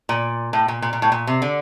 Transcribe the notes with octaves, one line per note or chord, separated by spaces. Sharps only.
A#2
A2
A#2
A#2
A#2
A2
A#2
C3
D3